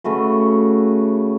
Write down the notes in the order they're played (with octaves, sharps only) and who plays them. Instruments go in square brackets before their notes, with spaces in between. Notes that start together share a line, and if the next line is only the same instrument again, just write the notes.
[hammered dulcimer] C#3 A3 F#4 B4